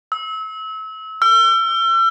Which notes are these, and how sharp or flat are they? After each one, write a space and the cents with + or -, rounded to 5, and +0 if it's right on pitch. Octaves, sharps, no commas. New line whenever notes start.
E6 -30
E6 +40